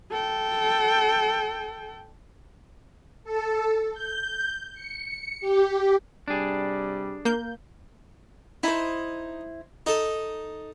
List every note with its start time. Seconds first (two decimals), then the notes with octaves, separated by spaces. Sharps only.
0.11 A4 G5
3.24 A4
3.93 G6
4.73 C#7
5.40 G4
6.28 C3 G3 D4 G#4
7.25 A#3 G6
8.63 D#4 E4 C5
9.86 D#4 A4 D#5